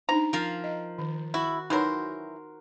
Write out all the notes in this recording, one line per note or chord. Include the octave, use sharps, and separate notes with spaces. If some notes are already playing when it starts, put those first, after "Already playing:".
D4 D#4 C5 A#5
F3 A#4 F5
D#5
D#3
E4 F#4
E3 F#3 D#4 A#4 C5 C#5